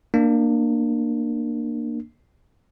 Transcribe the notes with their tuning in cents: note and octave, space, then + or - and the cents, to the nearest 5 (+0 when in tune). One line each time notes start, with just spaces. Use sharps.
A#3 +0 D4 +25